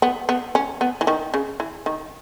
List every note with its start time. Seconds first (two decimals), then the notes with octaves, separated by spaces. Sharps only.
0.02 B3
0.29 B3
0.55 C#4
0.81 B3
1.01 E3
1.07 D#3
1.34 C#3
1.60 E3
1.86 D#3